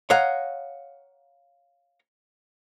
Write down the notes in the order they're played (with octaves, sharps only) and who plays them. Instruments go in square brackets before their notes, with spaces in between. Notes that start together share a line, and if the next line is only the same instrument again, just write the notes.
[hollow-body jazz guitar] C#5 D#5 F5 F#5 A#5